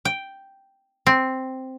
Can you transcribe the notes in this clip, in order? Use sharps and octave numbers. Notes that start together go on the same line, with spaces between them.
G5
C4